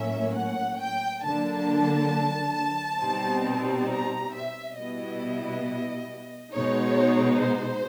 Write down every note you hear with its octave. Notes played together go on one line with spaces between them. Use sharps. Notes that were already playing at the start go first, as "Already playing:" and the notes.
Already playing: A2 F#3 A#3 C#4 E5
F#5
G5
D3 F#3 A#3 D4 A5
B2 G3 C4 D#4
A#5
E5
B2 G3 B3 E4 D#5
B2 G#3 B3 D#4 C#5
C5